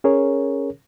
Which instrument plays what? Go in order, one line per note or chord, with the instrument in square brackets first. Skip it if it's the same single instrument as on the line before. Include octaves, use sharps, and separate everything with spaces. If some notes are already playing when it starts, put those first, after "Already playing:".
[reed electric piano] C#4 G#4 A#4 C#5